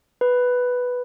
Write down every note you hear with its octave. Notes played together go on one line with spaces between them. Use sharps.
B4